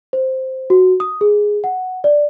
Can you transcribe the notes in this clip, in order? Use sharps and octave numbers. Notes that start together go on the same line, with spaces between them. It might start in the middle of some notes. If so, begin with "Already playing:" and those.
C5
F#4
D#6
G#4
F#5
D5